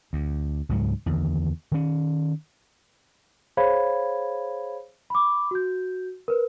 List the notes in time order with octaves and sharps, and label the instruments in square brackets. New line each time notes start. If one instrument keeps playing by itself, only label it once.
[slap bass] D2
C#2 G#2 F#3
E2 D3 D#3
D#3 C#4
[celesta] G#4 C5 C#5 F5 B5 G#6
B5 D6
F#4 G6
A#4 B4